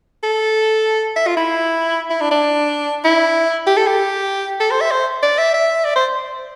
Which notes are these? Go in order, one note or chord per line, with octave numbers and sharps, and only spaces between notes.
A4
E5
F4
E4
E4
D4
D4
E4
G4
A4
G4
A4
C5
E5
C5
D5
E5
E5
D5
C5